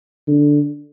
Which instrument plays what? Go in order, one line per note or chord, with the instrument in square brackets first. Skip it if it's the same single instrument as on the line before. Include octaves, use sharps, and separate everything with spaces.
[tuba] D3